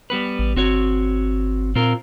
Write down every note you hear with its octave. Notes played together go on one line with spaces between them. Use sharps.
G3 B3 B4
A1
G1 C4 F#4 C#5
A#2 C4 F4 A#4